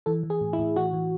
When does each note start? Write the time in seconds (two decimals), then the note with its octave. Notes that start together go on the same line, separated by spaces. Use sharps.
0.06 E3 A4
0.23 E3
0.30 G#4
0.41 A2
0.53 E4
0.59 A2
0.76 E3 F#4
0.93 E3